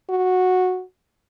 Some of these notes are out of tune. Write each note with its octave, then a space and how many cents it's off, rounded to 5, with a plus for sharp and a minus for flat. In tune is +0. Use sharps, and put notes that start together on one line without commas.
F#4 -10